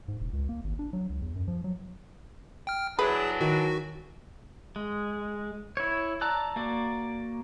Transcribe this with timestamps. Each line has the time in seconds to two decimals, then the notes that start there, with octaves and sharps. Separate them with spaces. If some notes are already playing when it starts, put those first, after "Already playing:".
0.08 G#2
0.20 E1
0.33 C#2
0.49 A#3
0.64 G#1
0.79 D4
0.93 F#3
1.09 C#2
1.22 E2
1.36 F#2
1.48 F3
1.64 F#3
2.67 G5 F6
2.99 E3 F#3 D4 G#4 B4
3.41 D#3 F#4
4.76 G#3
5.77 E4 C#5
6.21 D5 A5 A#5 E6 F#6
6.56 A#3 F#4 D5